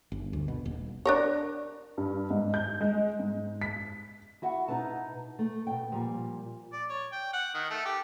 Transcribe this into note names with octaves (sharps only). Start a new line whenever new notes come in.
G1
D2
B2
D#1
D4 A#4 C#5
G2
G#2
G6
G#3
G#2
B6
E4 F#4 E5 F#5
B2 D#4 E4 B4 A5
A3
B2 G5
A#2 F3 G3
D5
C#5
G5
F#5
D#3
A3
G4